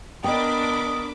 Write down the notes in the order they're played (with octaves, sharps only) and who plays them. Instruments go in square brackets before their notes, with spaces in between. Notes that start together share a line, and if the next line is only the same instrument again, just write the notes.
[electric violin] B3 A#4 [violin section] D4 B5 D6 [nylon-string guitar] D#5 G5 [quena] D#6